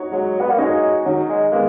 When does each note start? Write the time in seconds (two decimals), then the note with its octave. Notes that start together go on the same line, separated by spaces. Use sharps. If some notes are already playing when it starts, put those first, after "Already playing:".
Already playing: D#4 F#4 C#5
0.12 F#3 G#3
0.41 B3
0.50 A#3
0.58 G#3 D#4 F#4 C#5
1.05 D#3 F#3
1.29 G#3
1.52 G#3 A#3 B3